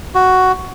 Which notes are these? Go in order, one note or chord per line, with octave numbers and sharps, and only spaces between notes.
F#4